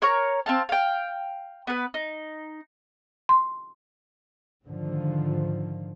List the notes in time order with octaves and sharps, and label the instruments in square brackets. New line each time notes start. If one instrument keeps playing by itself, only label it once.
[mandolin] A#4 C#5 A#5 C#6
C4 F5 A5
F5 G5
B3 B4
D#4
[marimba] C6
[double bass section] G#2 D3 D#3 F3